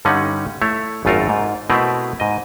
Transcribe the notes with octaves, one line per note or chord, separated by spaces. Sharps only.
G2 D3 G3 C#4 D#4 F#5
A3 E4 C#5
G#1 F#2 A3 F4 A4 A#4
G#2
B2 A3 C4 E4 A#4 B4
G#2 D#5